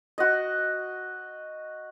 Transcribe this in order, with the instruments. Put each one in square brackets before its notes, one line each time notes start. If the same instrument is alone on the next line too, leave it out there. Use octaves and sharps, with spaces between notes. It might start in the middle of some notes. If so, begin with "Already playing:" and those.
[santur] F#4 D#5